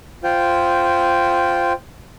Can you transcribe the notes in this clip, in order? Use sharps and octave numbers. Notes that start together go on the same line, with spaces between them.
F4 C5 G5